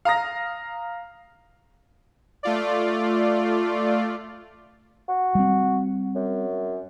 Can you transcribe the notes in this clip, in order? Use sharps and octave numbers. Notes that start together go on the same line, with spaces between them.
F5 A#5 D#6 A#6
A3 F4 D5
F#4
G3 C4
F#2